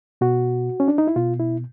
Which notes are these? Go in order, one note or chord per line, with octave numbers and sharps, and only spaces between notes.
B2 F#4
C#4
D4
D#4
E4
B2 F4
E4